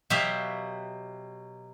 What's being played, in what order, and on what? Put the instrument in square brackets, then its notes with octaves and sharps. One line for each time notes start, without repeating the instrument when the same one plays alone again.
[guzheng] B2 F#3 F#4 G4 E5 F5